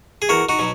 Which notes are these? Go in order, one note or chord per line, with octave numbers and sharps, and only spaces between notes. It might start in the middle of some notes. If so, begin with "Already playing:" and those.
G#4
E2 F#4 A#4
D#4 F#4
B2 F#3